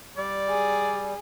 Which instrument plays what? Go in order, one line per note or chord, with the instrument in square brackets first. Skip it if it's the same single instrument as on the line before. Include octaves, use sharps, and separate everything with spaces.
[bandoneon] G3 [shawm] D5
[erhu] G#4